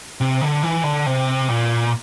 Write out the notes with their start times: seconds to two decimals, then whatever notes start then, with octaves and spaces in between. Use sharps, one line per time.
0.21 C3
0.41 D3
0.63 E3
0.84 D3
1.06 C3
1.49 A#2